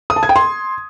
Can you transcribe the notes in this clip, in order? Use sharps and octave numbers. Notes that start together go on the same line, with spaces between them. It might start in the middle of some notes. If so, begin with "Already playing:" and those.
D#6
A5
G#6
G5
C6